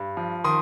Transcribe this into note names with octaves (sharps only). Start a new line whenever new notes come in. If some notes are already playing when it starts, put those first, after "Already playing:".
Already playing: G2
F3
D#3 C6 D#6